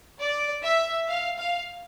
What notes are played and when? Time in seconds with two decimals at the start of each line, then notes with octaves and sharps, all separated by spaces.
0.20 D5
0.64 E5
1.08 F5
1.38 F5